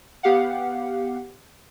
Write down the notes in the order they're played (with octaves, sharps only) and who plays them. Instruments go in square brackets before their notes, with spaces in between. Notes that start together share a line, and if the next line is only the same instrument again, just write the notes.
[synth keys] B3 G4 F5 F#5